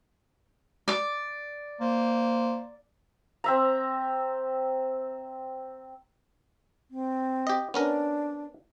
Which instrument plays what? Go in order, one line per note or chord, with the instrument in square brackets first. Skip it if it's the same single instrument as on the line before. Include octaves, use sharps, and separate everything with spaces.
[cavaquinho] D5 D6
[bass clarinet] A#3 [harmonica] C5
[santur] C4 E5 A#5
[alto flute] C4
[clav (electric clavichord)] G4 D#5
[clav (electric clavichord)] B3 C#4 A#4 [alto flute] D4